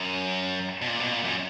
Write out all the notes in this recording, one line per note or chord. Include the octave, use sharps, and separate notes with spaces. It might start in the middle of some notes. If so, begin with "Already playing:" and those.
Already playing: F#2
B2
A#2
B2
A#2
F#2